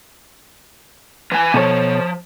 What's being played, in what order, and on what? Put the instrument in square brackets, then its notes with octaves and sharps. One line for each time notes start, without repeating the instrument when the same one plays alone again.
[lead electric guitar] E3 G#5
[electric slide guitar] B2 A4 C#5 [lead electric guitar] F3